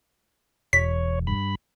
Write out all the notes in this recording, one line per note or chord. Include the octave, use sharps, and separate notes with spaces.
E1 C#5 B6
G2 B5